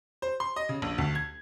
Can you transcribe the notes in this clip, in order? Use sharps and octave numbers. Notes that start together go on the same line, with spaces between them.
C5
C6
D#5
C#3
A#1
D2
G#6